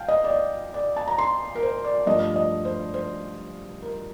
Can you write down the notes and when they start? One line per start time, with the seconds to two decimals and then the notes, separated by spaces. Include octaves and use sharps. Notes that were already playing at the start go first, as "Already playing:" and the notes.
Already playing: F5 G5 A5
0.08 D#5
0.24 D5
0.30 D#5
0.74 D5
0.96 A5
1.08 A#5
1.18 C6
1.55 A#4
1.63 C5
1.85 D5
2.06 G2 F3 A3 D4 D#5
2.36 D#5
2.65 C5
2.94 C5
3.82 A#4